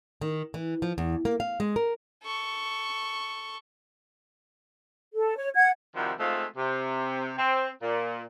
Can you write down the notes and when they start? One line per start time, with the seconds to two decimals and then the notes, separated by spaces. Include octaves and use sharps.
0.21 D#3
0.54 E3
0.82 F3
0.98 E2
1.25 A#3
1.40 F5
1.60 G#3
1.76 A#4
2.24 A4 C#6
5.14 A4
5.37 C#5
5.54 F#5 G#6
5.95 C3 D#3 F3 G3 E4 F#4
6.19 G#3 A3 C4 D#4 F4
6.57 C3
7.38 C4
7.82 A#2